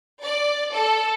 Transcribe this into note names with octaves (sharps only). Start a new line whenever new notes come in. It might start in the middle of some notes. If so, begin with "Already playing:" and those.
D5
A4